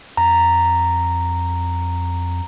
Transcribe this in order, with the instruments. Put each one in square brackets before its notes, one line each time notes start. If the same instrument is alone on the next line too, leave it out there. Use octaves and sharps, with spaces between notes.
[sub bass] F2 [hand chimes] A#5